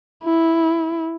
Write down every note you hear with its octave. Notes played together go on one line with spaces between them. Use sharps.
E4